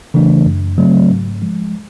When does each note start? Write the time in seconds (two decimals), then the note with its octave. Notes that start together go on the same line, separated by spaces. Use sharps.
0.14 C#3 E3 A3 D4
0.46 F#2
0.78 C#3 F#3 A3 C4
1.10 G#2
1.42 F3 G#3